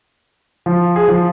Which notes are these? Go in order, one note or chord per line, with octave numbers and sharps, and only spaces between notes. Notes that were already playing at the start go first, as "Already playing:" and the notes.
F3
G#4
F3